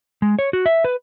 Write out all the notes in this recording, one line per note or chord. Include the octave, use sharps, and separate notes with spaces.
G#3
C#5
F#4
E5
B4